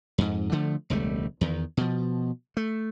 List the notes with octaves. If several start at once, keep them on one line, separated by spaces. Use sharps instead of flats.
F2 G#2
D3 F3 A3
E1 C#2 G3 A3
E2 D#3
B2 F3
A3